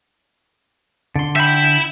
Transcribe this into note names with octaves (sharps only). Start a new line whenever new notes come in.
D3 C6
E5 G5 B5